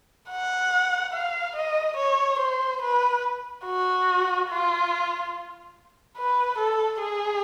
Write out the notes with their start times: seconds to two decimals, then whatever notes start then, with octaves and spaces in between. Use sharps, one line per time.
0.30 F#5
1.13 F5
1.56 D#5
1.97 C#5
2.40 C5
2.82 B4
3.65 F#4
4.49 F4
6.17 B4
6.59 A4
7.01 G#4